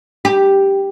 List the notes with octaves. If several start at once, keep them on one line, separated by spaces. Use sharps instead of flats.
G4